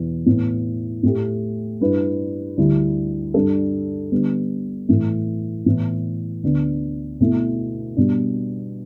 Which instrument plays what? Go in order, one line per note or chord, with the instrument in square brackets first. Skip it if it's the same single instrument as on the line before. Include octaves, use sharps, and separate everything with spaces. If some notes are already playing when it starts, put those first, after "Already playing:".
Already playing: [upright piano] E2 B2 B3 E4
A2 E3 B3
A2 A3 G4
G2 G3 E4 B4
D2 D3 G3 E4
G2 G3 D4 A4
D3 G3 B3
A2 E3 A3
A2 E3 B3 E4
D2 D3 B3 D4
B2 A3 E4
B2 G3 D4